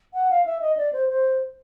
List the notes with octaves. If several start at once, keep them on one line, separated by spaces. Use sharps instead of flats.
F#5
F5
E5
D#5
D5
C5
C5